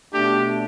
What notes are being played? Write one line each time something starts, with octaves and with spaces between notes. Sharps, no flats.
B2 A3 D4 G4